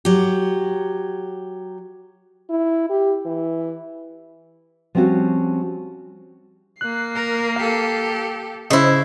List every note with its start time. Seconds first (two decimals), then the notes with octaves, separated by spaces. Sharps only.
0.05 F#3 G4
2.50 E4
2.90 G4
3.26 E3
4.95 F3 G3 C4 C#4 F#4
6.81 A#3 F#6 C7
7.15 A#4
7.56 G4 A4 F5
8.70 C#3 E4 C5 C#5 D#5